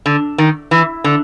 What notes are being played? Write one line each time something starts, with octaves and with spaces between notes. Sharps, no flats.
D3
D#3
E3
D3